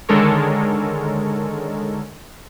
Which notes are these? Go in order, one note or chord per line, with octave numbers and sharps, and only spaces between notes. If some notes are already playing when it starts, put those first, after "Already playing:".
D3 D#3 G#3 A4 A#4 C#5